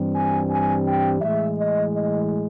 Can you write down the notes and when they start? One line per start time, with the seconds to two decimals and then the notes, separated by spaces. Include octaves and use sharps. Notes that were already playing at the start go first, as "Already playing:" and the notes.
Already playing: G2 E3 G3 C4
0.14 G#5
0.50 G#5
0.86 G5
1.21 A2 E3 G#3 E5
1.57 D#5
1.93 D#5